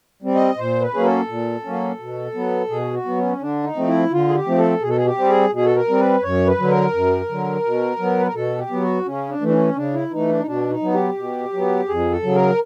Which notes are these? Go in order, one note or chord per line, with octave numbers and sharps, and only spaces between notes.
G3 C4
D#5
A#2 C5
B4
F#3 A#3 C#4 G#4
A4
A#2
F#3 A#3 C#4
B2
F#3 B3
B2 G#4
F#4
F#3 B3
C#4
D3 D4
D#4
F3 A3 C4
E4
D3 F4
G#4
G4
F3 A3 C4
A4
B2 G#4
A4
G#4
G4
G3 C4
G#4
B2 G#4
A4
A#4
G3 C4
B4
F#2 C#5
B4
D3 F#3
A#4
F#2
D3 F#3
B2
F#3 B3
B4
A#4
B2 A4
G4
F#3 B3
F#4
C#3 C#4
D4
E3 A3
D4
C#4
C#3 D4
E4
E3 A3 D#4
D4
D#4
B2 D4
D#4
F#3 B3
G4
B2
F#3 B3
F2 G#4
A4
C#3 F#3
A#4